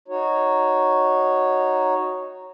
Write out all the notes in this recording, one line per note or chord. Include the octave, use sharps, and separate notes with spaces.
D#4 F#4 C#5